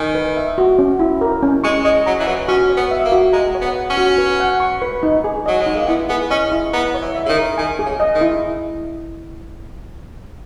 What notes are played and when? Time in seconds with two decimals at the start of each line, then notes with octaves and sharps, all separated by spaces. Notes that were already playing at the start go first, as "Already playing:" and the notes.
Already playing: D#3 G#5
0.15 B4
0.37 E5
0.58 F#4
0.79 C#4
0.99 E4
1.21 A#4
1.43 C#4
1.64 G#3 C#6
1.84 G#3 D#5
2.06 F#3 A#5
2.20 E3
2.27 F#3 B4
2.48 C#4 F#4
2.70 C#5
2.77 B3
2.91 E5
3.05 A#3
3.12 F#4
3.33 G#3 A#5
3.55 C#5
3.61 B3
3.75 F#5
3.90 C#4
3.97 F#4
4.18 B4
4.40 F#5
4.60 C#6
4.82 B4
5.03 D#4
5.24 G#4
5.46 F#3 D#5
5.61 G#3
5.66 D#4
5.75 A#3
5.88 B3 E4
6.09 B3 G#4
6.30 C#4 D#5
6.52 E4
6.73 B3 A#5
6.94 C#5
7.02 E3
7.15 E5
7.26 C#3
7.29 D#3
7.36 A#4
7.58 D#3 G#5
7.79 G#4
7.86 C#3
8.00 D#5
8.15 D#3
8.21 E4